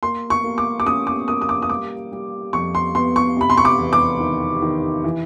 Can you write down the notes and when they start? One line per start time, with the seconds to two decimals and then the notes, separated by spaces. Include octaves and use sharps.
0.03 A#3 C6
0.30 C#6
0.44 A#3
0.58 D6
0.80 D6
0.86 C#4 D#6
1.07 D6
1.27 A#3 D#6
1.41 D#6
1.49 D6
1.62 D#6
1.70 G3 D6
2.12 G3
2.53 F2 C#6
2.75 C6
2.95 B3 C6
3.16 C#6
3.37 C3 B5
3.50 C6
3.57 C#6
3.65 D6
3.78 E2
3.93 D6
4.20 D#3
4.62 D#3
5.04 E3